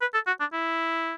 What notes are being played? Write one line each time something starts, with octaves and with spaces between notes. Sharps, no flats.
B4
A4
F#4
D4
E4